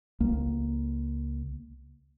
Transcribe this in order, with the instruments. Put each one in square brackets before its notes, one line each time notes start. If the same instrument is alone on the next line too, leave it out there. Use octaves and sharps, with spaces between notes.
[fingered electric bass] C#2 A#3